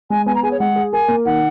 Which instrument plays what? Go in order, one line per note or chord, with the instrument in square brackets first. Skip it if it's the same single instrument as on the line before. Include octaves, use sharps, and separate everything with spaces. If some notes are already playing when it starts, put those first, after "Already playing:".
[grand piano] G#3 [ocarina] G#5
[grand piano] B3 [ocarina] G#5
[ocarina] A#5
[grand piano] G#4 [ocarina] G#5
[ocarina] C#5
[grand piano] G#3 [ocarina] F#5
[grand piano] G#4
[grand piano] A#4 [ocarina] G#5
[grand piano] A#3
[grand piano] D#3 [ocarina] F#5